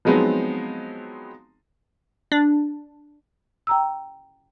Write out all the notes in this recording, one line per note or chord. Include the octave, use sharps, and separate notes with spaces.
F3 F#3 G#3 B3 C4 D#4
D4
G5 A#5 E6